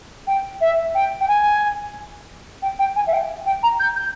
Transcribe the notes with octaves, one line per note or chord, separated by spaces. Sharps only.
G5
E5
G5
G5
G#5
G5
G5
G#5
E5
G5
G5
A#5
G6
G6